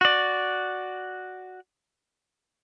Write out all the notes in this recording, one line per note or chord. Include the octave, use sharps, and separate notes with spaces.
F#4 D5